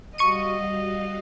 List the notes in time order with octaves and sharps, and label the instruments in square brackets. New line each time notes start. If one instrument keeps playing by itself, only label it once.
[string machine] G3 F#4 F5 [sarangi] D#5 [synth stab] C#6 C#7 D#7